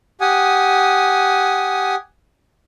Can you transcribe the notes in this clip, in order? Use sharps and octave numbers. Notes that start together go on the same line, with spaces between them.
G4 F#5 G#5 D#6